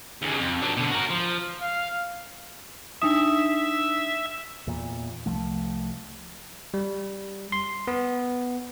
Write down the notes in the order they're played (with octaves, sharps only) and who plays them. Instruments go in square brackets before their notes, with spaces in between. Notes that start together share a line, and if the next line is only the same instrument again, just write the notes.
[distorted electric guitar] D#2 C#3
F2
F#3 D4
B2 D3
F#4 A#4
F3
[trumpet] F5
[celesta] D4 D#4 D#6 [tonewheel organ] E5
[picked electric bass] E2 A#2
C2 F3 A3
[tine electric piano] G3
C6
B3